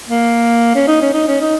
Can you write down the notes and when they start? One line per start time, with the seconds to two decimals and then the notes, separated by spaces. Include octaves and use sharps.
0.08 A#3
0.75 C#4
0.87 D#4
1.01 C#4
1.14 D#4
1.27 C#4
1.41 D#4